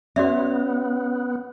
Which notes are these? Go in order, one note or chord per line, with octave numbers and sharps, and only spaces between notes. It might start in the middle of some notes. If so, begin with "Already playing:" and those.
B3 C#4 F#4 D5 E5